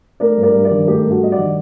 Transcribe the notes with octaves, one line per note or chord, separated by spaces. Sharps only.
A3 A#4 D5
G2
A#4 D5
G2
A#4 D5
D#3
A3 G4 A#4
G2
F#4 A4
G2 D#5
D5 F#5
D#3